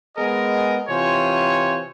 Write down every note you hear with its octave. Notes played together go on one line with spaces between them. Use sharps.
G#3 B3 G#4 A#4 D#5
C3 E3 F4 C5 C#5 G#5